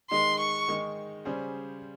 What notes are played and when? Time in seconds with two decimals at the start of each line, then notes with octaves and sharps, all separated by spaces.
0.11 D#3 G#3 D#4 C6
0.39 C#6
0.68 D#3 G#3 D#4
1.25 C#3 G3 C#4 G#4 C5